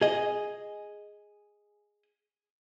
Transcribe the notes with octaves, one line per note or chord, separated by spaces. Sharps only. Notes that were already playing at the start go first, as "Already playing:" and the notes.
G#4 D#5